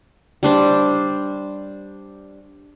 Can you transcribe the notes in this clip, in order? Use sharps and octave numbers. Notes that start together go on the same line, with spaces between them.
G3 D4 C5